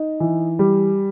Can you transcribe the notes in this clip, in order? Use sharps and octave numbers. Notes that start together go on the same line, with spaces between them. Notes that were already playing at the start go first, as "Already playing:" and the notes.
Already playing: D#4
E3
G3